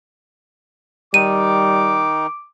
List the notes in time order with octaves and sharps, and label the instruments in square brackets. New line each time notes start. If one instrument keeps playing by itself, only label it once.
[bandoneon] D#3 D#4 [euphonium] G3 [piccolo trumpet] D6 [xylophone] D#7